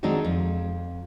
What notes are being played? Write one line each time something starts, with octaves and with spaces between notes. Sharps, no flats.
D#3 G#3 C4 D4 D#4 F#4
F2